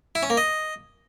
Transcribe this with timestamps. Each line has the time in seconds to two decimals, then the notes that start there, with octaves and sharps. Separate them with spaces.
0.15 E4
0.23 C#4
0.30 A#3
0.37 D#5